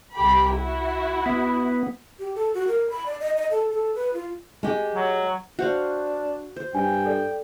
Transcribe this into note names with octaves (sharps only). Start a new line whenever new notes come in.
C2 G4 B5
E4 F#4
B3
G4
A4
F#4
A#4
B5
D5
D#5
D#5
A4
A4
B4
F4
G#3 G4
F#3
D4 F#4 C5 F5
C5
G2 G5 G#5
A4 D5